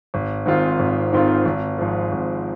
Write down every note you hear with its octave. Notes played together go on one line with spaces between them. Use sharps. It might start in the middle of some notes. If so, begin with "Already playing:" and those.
G#1
G#2 D#3 C4 F4
G#1
G#2 D#3 C4 F4
G#1
G#2 F3
G#1